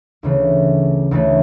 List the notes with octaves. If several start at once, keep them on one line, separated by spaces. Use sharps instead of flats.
D2 C#3 E3 A3
D2 C#3 E3 A3